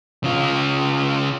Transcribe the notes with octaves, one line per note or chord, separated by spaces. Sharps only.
C#3 F4